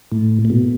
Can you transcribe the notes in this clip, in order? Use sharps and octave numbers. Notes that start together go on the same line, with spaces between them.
A2
A2
B2